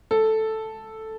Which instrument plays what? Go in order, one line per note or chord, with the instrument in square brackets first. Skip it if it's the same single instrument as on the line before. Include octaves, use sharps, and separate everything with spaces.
[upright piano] A4